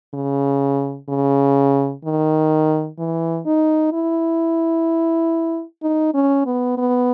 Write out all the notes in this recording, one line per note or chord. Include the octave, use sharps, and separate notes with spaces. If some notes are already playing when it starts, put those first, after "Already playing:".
C#3
C#3
D#3
E3
D#4
E4
D#4
C#4
B3
B3